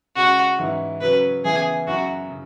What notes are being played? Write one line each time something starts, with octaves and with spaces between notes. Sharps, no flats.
C#3 G#3 C#4 F#4
G#2 E3 C#4 E4
C#3 F#3 C#4 B4
C#3 E3 B3 E4 G#4
F#2 F#3 E4 F#4
C#3